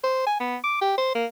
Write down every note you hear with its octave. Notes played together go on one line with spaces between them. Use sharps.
C5
G#5
B3
D6
G4
C5
A#3